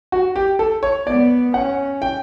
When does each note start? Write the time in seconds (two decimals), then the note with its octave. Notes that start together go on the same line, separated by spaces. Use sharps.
0.12 F#4
0.36 G4
0.59 A4
0.83 C#5
1.06 B3 D5
1.54 C#4 F#5
2.02 G5